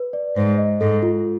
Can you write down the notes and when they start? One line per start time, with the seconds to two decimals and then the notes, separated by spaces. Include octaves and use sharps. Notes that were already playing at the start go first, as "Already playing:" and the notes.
Already playing: B4
0.13 D5
0.37 G#2 C5
0.58 D#5
0.81 G#2 A4
1.03 F4